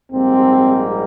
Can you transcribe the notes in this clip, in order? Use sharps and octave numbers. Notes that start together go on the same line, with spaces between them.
A#1 G#2 G3 A#3 C4